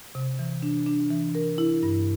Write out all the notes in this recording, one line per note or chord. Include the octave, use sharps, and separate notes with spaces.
C3
E3
D4
D4
E3
A#4
E4
G2